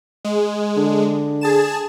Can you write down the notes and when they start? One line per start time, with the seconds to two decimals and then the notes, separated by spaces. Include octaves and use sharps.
0.25 G#3
0.77 D3
1.41 G#4 A5 E7